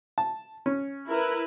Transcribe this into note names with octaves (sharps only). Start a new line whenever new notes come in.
A5
C#4
E4 A#4 B4